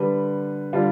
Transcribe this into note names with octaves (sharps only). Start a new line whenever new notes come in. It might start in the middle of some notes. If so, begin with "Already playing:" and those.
Already playing: D3 G3 B4
D3 G3 F4